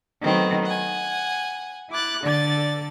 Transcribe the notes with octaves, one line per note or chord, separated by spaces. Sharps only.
D#3 F#3 A3 B3 C4
F#5 G#5
E4 D6 F#6 A6
D3 A4 D5 A6